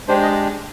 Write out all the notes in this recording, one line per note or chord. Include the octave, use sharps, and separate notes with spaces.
G#3 D4 G4 C5
D#5